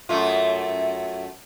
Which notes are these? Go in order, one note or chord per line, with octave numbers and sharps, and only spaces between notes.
F#2 A3 F4